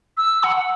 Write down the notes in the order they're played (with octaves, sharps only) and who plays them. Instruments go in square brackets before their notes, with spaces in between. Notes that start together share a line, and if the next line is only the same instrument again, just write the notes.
[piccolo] E6
F#5
F#5